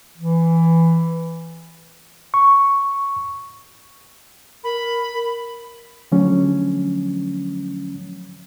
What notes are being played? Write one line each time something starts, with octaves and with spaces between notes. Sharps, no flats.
E3
C#6
A#4 B5
D3 F3 F#3 A3 C#4